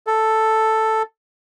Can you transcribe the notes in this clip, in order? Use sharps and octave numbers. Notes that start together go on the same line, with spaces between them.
A4